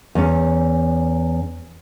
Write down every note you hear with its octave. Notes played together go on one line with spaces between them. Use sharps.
E2 C#4